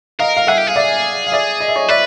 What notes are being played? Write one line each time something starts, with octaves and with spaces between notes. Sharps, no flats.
A#4 D#5 F5
F5
G#4 E5 F#5
G4
G#4 F5
D5 E5
F5
D5 E5
D#5
E5
C#5 D#5
B4 D5 E5